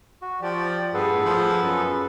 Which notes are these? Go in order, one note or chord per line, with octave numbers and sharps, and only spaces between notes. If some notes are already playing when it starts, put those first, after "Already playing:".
F#4
F3 G4 D5
G2 B3 G#4 A4 B4
A2
F3
F#2 C#4